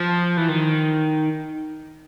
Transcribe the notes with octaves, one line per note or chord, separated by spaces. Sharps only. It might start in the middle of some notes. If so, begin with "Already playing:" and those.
Already playing: F3
E3
D#3